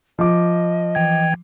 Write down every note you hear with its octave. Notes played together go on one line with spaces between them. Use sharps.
F3 D#5 D6
E3 G5 G#6